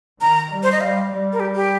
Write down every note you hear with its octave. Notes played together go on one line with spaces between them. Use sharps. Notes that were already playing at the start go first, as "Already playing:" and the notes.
D#3 A#5
G3
C5
D#5
G3 F5
G3
A#4
G4
G4